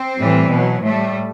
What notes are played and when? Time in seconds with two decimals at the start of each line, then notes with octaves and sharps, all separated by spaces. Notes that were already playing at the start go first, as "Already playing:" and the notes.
Already playing: C4
0.17 A2 E3 G3
0.50 B2 F#3
0.83 A2 G3 A3